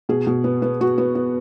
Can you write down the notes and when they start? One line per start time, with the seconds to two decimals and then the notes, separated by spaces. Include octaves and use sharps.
0.09 B2 G#4
0.27 B2
0.44 B3
0.62 B3
0.81 B3 F#4
0.98 B3
1.15 B3